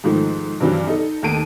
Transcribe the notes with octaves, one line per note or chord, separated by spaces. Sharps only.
G#2 D#3 F3 A3
G2 C3 E3 F#3
D#4 A4
D#2 D#3 A3 A5 D7 D#7